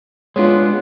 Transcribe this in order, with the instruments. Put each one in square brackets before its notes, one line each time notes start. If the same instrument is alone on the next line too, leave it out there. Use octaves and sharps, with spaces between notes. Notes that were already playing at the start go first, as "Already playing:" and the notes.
[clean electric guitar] G#3 B3 D4 [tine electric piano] F4 C#5